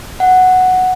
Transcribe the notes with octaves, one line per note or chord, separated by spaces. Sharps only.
F#5